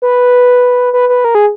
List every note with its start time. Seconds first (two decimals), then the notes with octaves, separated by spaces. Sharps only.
0.02 B4
0.93 B4
1.09 B4
1.25 A#4
1.35 G#4